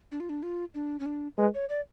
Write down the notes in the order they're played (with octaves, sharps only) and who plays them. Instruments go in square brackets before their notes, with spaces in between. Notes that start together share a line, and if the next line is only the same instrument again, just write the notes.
[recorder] D4
F4
D4
F4
D4
C#4
D4
[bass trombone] G#3 [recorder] B4
[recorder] C#5
D5